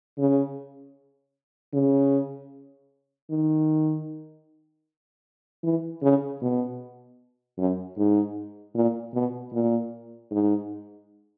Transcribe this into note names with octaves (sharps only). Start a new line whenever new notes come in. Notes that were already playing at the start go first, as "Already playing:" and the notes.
C#3
C#3
D#3
E3
C#3
B2
F#2
G#2
A#2
B2
A#2
G#2